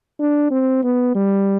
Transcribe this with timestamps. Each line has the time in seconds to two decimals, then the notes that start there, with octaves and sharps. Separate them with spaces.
0.20 D4
0.51 C4
0.84 B3
1.15 G3